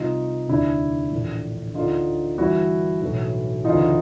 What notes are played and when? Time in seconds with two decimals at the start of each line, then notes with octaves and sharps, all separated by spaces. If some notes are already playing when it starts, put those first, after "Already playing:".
Already playing: C2 C3 D#3 D#4 F4
0.48 F1 D#2 D3 D4 E4
1.11 A#1 A2 E3
1.75 D2 D3 D#4 F4
2.38 G1 G2 E3 E4 F#4
3.02 B1 A2 E3
3.64 D2 C#3 E3 D#4 F4